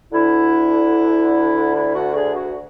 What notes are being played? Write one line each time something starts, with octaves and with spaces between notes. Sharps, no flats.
D2 D3 E4
E4
F#4
G#4
F#4